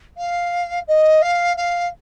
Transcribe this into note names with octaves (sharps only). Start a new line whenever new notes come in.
F5
D#5
F5
F5